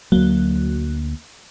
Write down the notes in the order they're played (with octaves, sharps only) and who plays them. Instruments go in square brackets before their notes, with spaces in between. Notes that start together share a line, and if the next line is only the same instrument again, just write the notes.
[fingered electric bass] D2 A#3 [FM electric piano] F#3